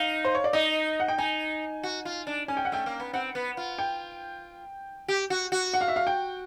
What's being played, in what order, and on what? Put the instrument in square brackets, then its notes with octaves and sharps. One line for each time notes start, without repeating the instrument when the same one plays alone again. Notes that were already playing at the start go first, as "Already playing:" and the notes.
Already playing: [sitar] D#4 [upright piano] F5
[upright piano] C5
C#5
D5
[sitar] D#4 [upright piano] D#5
[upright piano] F#5
G5
[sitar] D#4 [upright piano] G#5
[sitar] F#4
F4
D4
[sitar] C#4 [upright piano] G#5
[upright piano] G5
F#5
[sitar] A3 [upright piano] G5
[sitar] A#3
B3
[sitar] C4 [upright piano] F#5
[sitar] B3
F4
[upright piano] G5
[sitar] G4
F#4
F#4
[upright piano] F#5
F5
E5
F5
G5